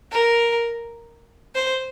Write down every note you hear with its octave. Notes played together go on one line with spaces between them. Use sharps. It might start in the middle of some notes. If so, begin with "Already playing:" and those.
A#4
C5